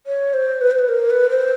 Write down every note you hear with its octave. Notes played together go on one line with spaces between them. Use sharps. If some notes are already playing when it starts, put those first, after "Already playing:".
C#5
C5
B4
C5
B4
A#4
B4
C5